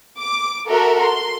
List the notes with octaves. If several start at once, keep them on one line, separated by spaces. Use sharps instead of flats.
D6
F#4 A4 A#4 E5
C6